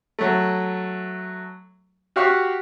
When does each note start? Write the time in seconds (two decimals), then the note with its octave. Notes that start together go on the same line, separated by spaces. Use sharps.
0.19 F#3 A3
2.16 F#4 G4 F5 F#5 C#6